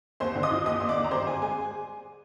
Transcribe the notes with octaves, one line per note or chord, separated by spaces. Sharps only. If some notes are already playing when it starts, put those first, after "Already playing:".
D#2 C5 C6
D3
D#5 D#6
F3
D#2 D#5 D#6
D#2 C6
D5 D6
D3
A#5
G2 C5 C6
D3 G#4 G#5
G#3 G#4 G#5